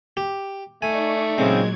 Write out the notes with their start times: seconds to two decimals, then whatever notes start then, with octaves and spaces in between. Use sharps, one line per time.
0.17 G4
0.82 A3 D#4 D5 G#5 C#6
1.38 A#2 C#3 F#3 G#3 C4 G#6